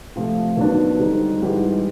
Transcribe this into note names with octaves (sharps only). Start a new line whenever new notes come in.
F2 C3 F3 A3
D#2 D#3 F#3 B3 D4
D3 G3 C4 D#4
G#2 E3 G3